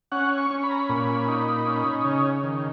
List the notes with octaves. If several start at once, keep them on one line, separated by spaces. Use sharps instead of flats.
C#4 F#5
C#6
C#4
B5
A#5
B5
A#2
D#4
C#4
C#3
D#3